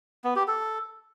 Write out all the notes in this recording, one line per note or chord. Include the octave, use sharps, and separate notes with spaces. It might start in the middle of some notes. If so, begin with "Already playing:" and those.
B3
G4
A4